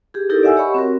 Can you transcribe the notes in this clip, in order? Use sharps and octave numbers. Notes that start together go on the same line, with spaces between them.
G4 G#4
D#4 E4 G4 A4 A#4
D5 E5 F#5 G#5 E6
G4 C#5 D#5 F#5 B5 C#6
C4 F#4 A#4